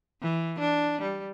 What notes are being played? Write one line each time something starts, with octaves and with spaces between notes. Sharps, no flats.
E3
D4
G3